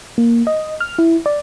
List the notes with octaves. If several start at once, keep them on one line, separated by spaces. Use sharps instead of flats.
A#3
D#5
F6
E4
D5